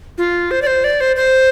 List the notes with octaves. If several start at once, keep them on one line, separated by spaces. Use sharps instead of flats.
F4
C5
D5
C5
D5
C5
C5